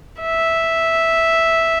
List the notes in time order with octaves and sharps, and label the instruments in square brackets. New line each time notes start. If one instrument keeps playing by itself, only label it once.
[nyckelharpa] E5